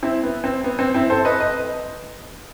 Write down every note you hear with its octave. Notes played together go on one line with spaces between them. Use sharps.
C4 E4
B3
C4
B3
C4
C4 E4
A4 C5
B4 D#5
B4 D#5